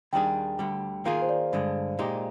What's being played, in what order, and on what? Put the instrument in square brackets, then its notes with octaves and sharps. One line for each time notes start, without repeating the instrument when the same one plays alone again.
[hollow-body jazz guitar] D#2 D#3 G3 D4 G#4 [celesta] G5
[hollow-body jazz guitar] D2 D3 G3
[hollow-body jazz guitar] D#3 A#3 F4 G#4 [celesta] F5
[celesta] C5
D5
[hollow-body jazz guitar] G2 D3 G#3
A#2 G#3 D#4 G4